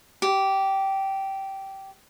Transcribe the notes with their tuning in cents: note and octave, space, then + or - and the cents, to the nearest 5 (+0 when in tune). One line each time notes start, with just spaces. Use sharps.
G4 -15